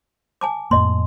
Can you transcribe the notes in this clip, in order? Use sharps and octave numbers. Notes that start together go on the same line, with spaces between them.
G#5 A5 D6
F2 A2 A#3 D#5 C6